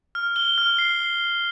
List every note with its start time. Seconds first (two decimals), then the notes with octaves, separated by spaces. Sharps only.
0.15 F6
0.36 G7
0.58 F6
0.79 C7